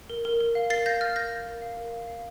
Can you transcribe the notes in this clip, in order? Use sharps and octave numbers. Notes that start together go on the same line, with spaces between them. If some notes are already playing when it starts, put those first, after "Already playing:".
A#4
A#4
A#4
F5
A#4 A6 C7
F5 G6 A#6
F5 F6 A6
A#4 G6 A#6
F5
A#4
F5
A#4
F5
F5